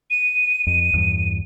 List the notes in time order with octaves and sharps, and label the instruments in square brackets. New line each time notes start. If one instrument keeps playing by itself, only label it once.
[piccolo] D#7
[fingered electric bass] F2
E2 G2